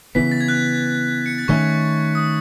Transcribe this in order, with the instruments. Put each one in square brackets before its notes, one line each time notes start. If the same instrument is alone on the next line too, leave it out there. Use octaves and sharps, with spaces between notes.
[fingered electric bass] C#3 E3 B3 [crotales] B6
[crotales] A6
G#6
F#6
C#7
A6
[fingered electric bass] D#3 A3 C#4 [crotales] C#6
[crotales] D#6